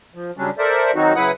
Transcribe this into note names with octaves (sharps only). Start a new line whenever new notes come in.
F3
C#3 F#3 G3 C#4 D4
A4 A#4 C5 D5 E5
D#3 F#3 C4 D#4 F#4
C#3 F#3 E4 B4 F#5 D#6